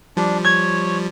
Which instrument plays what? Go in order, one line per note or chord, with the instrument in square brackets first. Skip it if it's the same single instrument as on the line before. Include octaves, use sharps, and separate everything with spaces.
[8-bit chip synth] F3 G3 [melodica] D4
[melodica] C#5 [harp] G#6